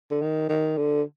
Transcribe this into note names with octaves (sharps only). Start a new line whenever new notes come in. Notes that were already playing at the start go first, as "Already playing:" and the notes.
D3
D#3
D#3
D3